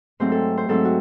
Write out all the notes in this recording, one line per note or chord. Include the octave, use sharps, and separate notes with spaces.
G#2 F#3 A3 C4 C5
A4
C5
G#2 F#3 A3 C4 A4
F#4